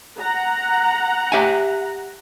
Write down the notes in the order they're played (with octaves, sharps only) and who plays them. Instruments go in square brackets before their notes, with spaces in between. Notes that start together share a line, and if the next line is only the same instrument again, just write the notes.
[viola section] F#5 A#5
[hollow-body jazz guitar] G4 E5 G#5